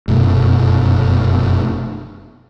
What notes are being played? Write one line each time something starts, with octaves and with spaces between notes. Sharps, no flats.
F1 F#2 B2 A3